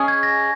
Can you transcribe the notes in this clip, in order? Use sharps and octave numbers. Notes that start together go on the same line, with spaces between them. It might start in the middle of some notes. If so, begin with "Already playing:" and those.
Already playing: C#4 G#4 D#5 G#5
G#6
A#6